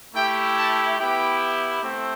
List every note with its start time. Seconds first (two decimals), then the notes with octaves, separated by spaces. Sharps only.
0.14 A3 E4 G4 G5
0.57 A5
0.99 B3 E4 G4 G5
1.82 A3 C4